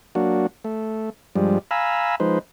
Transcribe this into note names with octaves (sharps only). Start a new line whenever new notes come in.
F#3 A#3 D4 F#4
A3
G2 F3 G3 G#3
F5 G#5 A#5 B5 E6
F3 G#3 D#4 B4 C5